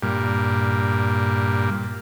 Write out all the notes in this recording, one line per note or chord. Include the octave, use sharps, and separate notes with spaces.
G2 A#2